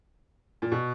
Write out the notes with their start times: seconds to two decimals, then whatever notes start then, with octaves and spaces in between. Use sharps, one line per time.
0.62 A#2
0.72 B2